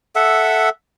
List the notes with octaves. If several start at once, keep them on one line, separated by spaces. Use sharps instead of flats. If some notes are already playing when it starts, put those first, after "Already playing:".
A4 E5 F#5